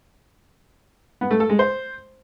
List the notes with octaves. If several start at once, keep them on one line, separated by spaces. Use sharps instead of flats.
B3
A3
A4
G#3
C5